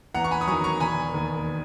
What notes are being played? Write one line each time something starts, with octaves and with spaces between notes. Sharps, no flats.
E2 F#5 A#5
C#6
G#5 B5
D#6
D#3 F#3 A#5 C#6
A#5 C#6
E1 G#5 B5
D#2 D#3